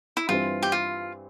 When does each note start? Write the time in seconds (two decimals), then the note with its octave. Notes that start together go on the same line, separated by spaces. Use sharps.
0.17 E4
0.29 G2 E3 G3 C4 F4
0.63 G4
0.72 F4